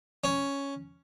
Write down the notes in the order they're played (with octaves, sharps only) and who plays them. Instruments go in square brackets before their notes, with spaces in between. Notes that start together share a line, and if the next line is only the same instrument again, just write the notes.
[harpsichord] C#4